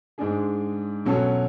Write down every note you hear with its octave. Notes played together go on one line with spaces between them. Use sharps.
G#2 G#3 D4 G#4
B2 F#3 C#4 F#4 A4